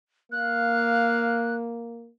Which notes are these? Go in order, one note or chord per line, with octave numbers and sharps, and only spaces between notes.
A#3 F5 F#6